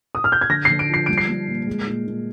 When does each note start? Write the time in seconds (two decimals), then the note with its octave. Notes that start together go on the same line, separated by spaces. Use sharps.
0.15 D#6
0.24 F6
0.32 G6
0.41 G#6
0.49 D3 A#6
0.65 C7
0.70 D3
0.79 D7
0.88 F3
0.94 C7
1.06 G3 D7
1.18 C7
1.29 G3
1.48 A#2
1.67 G#3
1.87 A#2
2.07 A#2